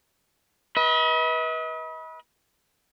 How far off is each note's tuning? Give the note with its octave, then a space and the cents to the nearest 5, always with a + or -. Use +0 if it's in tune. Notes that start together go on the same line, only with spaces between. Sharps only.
B4 -25 D#5 +40